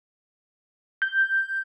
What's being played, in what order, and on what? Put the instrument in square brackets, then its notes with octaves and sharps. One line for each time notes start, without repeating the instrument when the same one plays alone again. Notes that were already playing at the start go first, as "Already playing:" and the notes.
[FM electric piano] G6